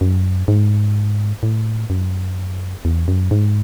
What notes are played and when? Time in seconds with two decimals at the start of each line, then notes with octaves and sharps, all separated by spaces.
0.01 F#2
0.48 G#2
1.43 A2
1.90 F#2
2.85 E2
3.08 F#2
3.31 G#2